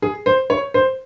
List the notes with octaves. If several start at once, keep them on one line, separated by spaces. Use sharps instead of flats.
G#4
C5
C#5
C5